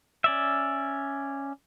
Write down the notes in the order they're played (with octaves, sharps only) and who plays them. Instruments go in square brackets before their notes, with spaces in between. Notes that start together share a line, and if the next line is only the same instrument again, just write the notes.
[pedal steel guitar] C#4 D5 E5